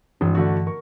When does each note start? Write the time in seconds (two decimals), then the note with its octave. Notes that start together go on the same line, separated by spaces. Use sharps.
0.21 G#1 G2 E3 D4
0.35 D3 A3 F#4
0.66 A#4 C#6